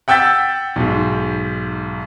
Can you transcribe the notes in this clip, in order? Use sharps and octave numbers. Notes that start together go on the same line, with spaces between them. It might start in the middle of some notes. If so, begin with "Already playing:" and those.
F#5 G5 E6 G6 A6 B6
B1 G#2